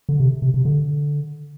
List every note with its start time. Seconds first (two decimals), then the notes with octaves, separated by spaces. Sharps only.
0.09 D3
0.20 C3
0.42 C3
0.54 C3
0.65 D3